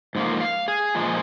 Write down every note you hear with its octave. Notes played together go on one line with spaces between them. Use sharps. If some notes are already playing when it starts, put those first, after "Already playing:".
G#2 F3 A#3
F5
G#4
A#2 F3 G#3